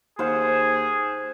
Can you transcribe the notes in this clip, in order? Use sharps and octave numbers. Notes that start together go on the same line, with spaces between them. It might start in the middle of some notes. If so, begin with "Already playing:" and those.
D#2 G#4 C5 F5 F#5